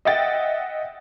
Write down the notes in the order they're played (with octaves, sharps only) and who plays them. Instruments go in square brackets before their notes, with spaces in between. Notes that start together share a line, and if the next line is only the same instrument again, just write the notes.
[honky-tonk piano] D#5 E5 F#5 G5 A6